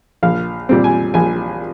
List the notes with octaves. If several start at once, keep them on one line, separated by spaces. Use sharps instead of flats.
A#1 F5
A#2 G3 C4
G#5
A#1 G#5